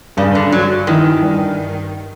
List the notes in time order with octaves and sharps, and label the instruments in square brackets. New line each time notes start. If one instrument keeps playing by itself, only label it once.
[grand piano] G2 [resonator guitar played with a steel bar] C#3
[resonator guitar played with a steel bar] D3
[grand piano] G2 [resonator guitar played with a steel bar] F#3
[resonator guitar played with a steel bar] D#3 [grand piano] E3
[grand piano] G2